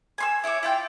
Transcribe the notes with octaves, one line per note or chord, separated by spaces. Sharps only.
G#5 C6 E6
E4 C#5 E5 D6
E4 F4 G5